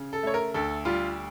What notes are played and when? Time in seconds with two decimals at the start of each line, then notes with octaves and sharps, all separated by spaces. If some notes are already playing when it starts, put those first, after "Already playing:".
Already playing: C#3
0.13 A4
0.23 A3 C#5
0.34 A#4
0.54 D2 A4
0.85 G3 F4